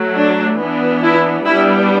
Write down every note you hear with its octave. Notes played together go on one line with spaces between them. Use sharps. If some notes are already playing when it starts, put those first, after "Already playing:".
Already playing: F#3 A3
D4
E3 B3 D4
E4
G3 B3 D4 E4